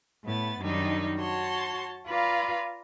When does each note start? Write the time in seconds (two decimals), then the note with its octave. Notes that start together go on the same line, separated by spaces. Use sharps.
0.25 A2 B3 A6
0.61 F#2 D#3 G3 D4 D#4
1.17 F#4 C#5 A5 C6
2.09 F4 B4 D5 F5 A#5